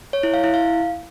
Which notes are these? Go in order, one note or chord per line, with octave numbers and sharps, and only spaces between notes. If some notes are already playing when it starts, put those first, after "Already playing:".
C#5
E4
F5
E4
F5